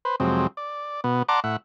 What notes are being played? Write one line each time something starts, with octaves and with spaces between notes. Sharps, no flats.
B4 C5
F2 C3 F#3 G#3 C4
D5
B2 B3
D5 F#5 A5 A#5 C6 D6
A2 E5 F#5